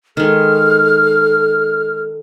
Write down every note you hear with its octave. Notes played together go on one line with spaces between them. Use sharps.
D#3 G#3 A4 F6